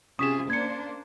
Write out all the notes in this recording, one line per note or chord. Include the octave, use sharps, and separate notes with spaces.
C3 C#4 F4 G#4 D#6 B6 E7
A#3 D4 C5 G#6 C#7